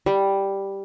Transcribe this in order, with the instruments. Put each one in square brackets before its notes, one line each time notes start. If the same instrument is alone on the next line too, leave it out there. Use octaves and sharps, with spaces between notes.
[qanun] G3